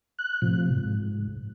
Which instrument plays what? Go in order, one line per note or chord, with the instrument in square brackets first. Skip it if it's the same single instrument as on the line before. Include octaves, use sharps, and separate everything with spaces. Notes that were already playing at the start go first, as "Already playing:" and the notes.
[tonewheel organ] F#6
A2 C3 F3
G#2